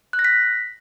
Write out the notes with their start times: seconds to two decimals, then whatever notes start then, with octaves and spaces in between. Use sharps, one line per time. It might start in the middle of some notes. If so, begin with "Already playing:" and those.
0.13 F#6
0.19 A#6
0.25 B6